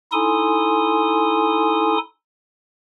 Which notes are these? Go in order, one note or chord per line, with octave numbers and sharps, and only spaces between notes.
D#4 E4 A4 G#5 C6 D#6